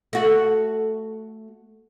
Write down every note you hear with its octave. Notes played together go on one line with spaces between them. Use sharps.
A3 F#4